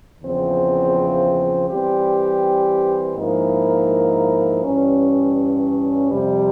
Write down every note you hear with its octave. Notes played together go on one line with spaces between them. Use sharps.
E2 C#3 F3 C4
E3 G3 C4 G4
G#2 F3 A#3 E4 A#4
G2 E3 G3 C#4
F2 C3 G3